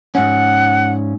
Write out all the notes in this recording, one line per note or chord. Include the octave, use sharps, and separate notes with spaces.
G#2 C#4 F#5